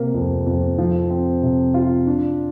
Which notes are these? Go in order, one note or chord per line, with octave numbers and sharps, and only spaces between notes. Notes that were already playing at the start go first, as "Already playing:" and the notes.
Already playing: C3 A#3
F2
F2
F3
C4
C3
F4
D4